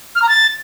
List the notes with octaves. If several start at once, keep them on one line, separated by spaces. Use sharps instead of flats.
F6
A#5
A6